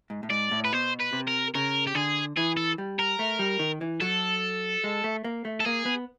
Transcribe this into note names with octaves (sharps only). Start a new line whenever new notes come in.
G#2
A2
G#2 D5
A2
B4
B2 C5
B4
C3
A#4
C#3 A#4
G4
D3 G#4
E3 G#4
A4
G3
A#4
A3
G3
D#3
E3
F#3 A4
G#3
A3
A#3
A3
A4
A#3 G#4
B3